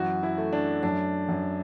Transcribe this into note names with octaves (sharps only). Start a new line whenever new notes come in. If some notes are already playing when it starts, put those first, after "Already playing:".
Already playing: F#2 E3 F#4
E4
A3
D4
F#2 D4
F#2